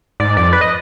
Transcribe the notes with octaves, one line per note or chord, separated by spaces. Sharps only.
G#2 D5
F2 D5
B4
D#5